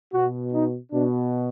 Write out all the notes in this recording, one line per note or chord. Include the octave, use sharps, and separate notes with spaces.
B2 F#4
D#4
B2 D4